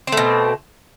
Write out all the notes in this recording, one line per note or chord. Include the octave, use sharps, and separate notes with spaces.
B2 A3 C4